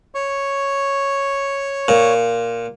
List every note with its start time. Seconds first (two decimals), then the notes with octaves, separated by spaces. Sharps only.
0.15 C#5 C#6
1.88 A#2